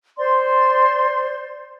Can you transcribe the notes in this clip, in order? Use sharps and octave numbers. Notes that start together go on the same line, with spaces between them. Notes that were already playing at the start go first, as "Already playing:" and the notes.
C5 D5 C6